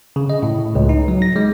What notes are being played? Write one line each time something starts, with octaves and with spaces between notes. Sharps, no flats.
C#3
D#5
A2
C#2
D#4
F#3
A#6
G#3